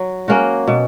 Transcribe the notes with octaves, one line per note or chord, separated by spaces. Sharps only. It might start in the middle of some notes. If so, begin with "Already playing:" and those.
Already playing: F#3
A#3 C#4 F#4
B2